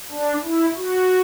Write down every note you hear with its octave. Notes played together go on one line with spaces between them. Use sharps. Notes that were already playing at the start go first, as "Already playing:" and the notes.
D4
E4
F#4